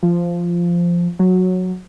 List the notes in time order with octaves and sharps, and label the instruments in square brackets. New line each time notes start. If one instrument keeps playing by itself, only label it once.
[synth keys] F3
F#3